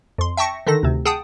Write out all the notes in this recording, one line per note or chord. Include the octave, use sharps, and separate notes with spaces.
F2 C6
E5 G5 A5 C#6 A#6 C#7
D3 D#3 D#4 A4 A#6
D2 C3
G#4 F#5 G5 A5 D#6